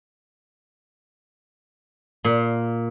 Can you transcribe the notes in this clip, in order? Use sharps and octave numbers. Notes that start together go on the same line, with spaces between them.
A#2